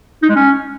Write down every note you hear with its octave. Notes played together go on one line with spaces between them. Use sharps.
D#4
G#3
C#4